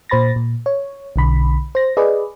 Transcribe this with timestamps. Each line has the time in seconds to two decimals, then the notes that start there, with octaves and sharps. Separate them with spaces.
0.09 A#2 C5 B5 A6 A#6
0.36 A#2
0.66 C#5
1.16 B1 D3 B5
1.75 C5 A#6
1.97 G#4 B4 D5 D#5